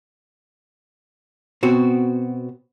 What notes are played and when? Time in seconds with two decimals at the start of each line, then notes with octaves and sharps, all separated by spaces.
1.63 B2 C4 F#4